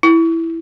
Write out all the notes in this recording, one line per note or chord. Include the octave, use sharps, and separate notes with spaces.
E4